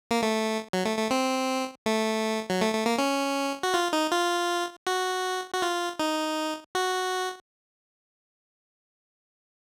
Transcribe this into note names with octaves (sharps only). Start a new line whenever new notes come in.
A#3
A3
F#3
A3
A3
C4
A3
F#3
A3
A3
A#3
C#4
F#4
F4
D#4
F4
F#4
F#4
F4
D#4
F#4